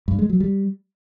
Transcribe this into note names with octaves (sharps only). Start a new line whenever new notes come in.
G2
G#3
F#3
G3